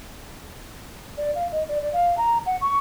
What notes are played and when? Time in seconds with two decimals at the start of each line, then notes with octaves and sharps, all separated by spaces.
1.18 D5
1.35 F5
1.52 D#5
1.69 D5
1.81 D5
1.93 F5
2.18 A#5
2.46 F#5
2.61 C#6